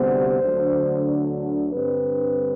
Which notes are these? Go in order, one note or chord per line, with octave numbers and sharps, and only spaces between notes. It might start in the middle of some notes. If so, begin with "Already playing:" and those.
Already playing: D2 C3 G3 B3 C5
D2 D3 F#3 A3 D4
G2 D3 G3 C4 B4